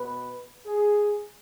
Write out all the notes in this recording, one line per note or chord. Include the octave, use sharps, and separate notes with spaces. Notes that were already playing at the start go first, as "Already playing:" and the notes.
Already playing: B2 B3 B4
G#4